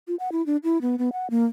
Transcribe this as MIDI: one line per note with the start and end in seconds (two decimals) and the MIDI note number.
0.08 0.15 65
0.19 0.31 78
0.32 0.45 64
0.46 0.57 62
0.64 0.81 64
0.81 0.96 59
0.99 1.09 59
1.13 1.30 78
1.30 1.45 58